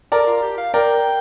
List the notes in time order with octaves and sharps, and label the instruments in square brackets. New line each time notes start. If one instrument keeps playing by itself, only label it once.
[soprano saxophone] A4 [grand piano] A#4 D5
[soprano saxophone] F4
G4
F5
[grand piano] A#4 D5 [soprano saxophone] G5